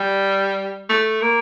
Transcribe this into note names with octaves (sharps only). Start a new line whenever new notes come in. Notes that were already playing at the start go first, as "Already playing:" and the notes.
Already playing: G3
A3
A#3